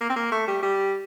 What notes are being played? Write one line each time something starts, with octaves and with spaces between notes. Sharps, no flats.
A#3
C4
A#3
A3
G3
G3